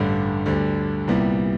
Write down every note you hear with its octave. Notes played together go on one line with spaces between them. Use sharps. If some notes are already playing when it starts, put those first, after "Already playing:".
Already playing: A1 G2 D3 G3
D2 D3 G3
C2 A#2 G3 B3 E4